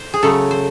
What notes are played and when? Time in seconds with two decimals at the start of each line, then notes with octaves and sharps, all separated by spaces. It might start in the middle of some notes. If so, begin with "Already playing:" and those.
Already playing: C5
0.14 G#4
0.23 C#3 F#3 A3 A4
0.51 C5